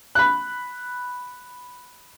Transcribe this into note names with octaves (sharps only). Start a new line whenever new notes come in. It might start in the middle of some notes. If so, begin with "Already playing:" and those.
B5 F#6